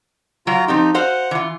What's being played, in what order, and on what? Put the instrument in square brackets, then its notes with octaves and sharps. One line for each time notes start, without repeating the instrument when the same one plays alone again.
[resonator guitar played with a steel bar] F#3 [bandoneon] F4 A#5
[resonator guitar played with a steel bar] F3 C4 G4 [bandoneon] D#4
[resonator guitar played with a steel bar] F#4 C5 F5 [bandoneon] F#5
[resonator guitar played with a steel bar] E3 F4